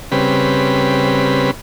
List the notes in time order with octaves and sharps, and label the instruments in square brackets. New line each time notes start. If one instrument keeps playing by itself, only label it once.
[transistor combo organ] C#3 G3 C4 B4